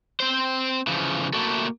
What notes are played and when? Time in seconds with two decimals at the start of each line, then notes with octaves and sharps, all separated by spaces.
0.20 C4 C5
0.87 C#3 E3 F3
1.33 A3 A#3 E4 F#4 A4